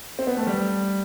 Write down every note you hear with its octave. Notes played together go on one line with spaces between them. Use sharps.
C4
B3
A3
G3